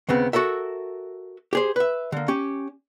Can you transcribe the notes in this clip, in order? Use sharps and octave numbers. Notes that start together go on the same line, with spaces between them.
D#2 C#3 B3 C4
F#4 A4 A#4 E5
G4 G#4 C5
B4 E5
D3 A#3
C#4 G4